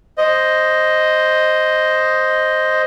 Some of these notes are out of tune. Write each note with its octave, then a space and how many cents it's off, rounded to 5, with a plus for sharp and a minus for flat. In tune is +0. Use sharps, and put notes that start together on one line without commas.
C5 +0 D#5 +0